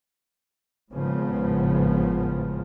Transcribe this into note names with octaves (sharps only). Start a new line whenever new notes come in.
G#1 A2 C#3 F3 B3